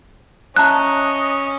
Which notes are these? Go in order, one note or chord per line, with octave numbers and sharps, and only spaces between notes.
C#4 D#5 E5 A5 A#5 F#6